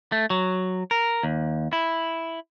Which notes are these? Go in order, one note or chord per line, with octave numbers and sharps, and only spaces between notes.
A3
F#3
A#4
D#2
E4